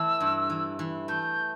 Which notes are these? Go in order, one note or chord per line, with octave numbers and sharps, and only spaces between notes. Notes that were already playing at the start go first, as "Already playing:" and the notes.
Already playing: E3 A3 E6
G2
E3
E3
A3 G6